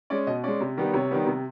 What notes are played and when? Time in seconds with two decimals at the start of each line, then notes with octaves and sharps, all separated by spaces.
0.10 G#3 C#4 D5
0.27 B2 D#5
0.44 G#3 C#4 D5
0.60 C3
0.77 D#3 G3 B3
0.93 C3 C#5
1.11 D#3 G3 B3
1.26 C3